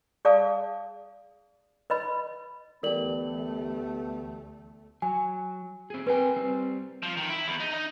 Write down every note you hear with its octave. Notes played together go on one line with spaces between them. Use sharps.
G#4 D5 F5 A5 D#6
B4 D#5 B5
D2 E3 A3 B3 G4 A#4 D5 F#7
F#3 G#5
C4 G#4
C4 A#4 B4 G5 G#5
G3 C4
F3
D#3
E4
E2
D#4
D#4